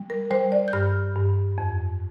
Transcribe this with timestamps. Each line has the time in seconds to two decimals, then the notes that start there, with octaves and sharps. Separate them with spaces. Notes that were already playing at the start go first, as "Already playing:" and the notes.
Already playing: G3
0.10 A#4
0.31 G3 C5
0.52 D5
0.68 G6
0.73 G2 F6
1.16 G2
1.58 F2